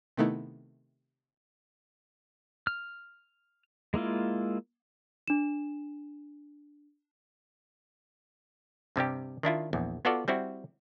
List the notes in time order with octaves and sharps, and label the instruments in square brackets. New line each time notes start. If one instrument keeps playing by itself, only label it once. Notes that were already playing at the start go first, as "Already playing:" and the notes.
[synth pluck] C3 D#3 A3 B3 D#4 E4
[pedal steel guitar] F6
G#3 A#3 E4 F4
[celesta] D4 E7
[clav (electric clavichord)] G2 C3 G3 G4
D#3 D4 E4 F4
A#1 E2
B3 F4 F#4 A4 D5 F5
G3 C4 E4 F#4